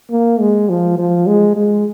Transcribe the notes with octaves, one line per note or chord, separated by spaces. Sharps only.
A#3
G#3
F3
F3
G#3
G#3